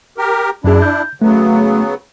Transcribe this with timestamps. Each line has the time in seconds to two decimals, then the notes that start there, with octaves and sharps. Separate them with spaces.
0.18 G4 A#4
0.64 F#2 D4 E4 G#4
0.82 G6
1.22 C#3 F#3 A3 B3